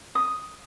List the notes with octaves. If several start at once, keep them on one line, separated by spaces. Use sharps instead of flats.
D#6